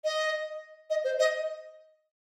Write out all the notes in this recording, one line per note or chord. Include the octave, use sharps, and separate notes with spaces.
D#5
D#5
C5
D#5